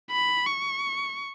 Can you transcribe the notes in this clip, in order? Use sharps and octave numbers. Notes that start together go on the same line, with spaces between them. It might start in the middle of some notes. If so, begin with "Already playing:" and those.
B5
C#6